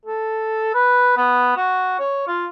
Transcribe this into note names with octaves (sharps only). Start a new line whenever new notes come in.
A4
B4
B3
F#4
C#5
F4